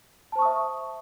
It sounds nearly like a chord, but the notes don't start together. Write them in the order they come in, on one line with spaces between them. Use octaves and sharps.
A5 C5 C#6 D#6 E5